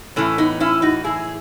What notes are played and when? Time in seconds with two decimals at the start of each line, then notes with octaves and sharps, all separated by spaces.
0.16 A2 E3 A3 C#4
0.38 B3 D#4
0.60 C#4 E4
0.82 D#4 F#4
1.04 E4 G#4